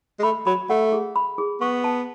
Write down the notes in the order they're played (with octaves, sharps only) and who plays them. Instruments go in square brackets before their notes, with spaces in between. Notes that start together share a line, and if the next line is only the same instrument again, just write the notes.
[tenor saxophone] G#3
[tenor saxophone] A3 [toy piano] B5
[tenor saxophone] F#3 [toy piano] B5
[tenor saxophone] A3 [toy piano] F#5
[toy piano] G#4
B5
G#4
[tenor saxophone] B3 [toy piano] C#6
[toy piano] A5